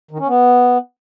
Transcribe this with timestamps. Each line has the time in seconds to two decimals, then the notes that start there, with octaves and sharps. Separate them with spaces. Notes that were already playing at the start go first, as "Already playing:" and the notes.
0.11 D#3
0.19 C#4
0.28 B3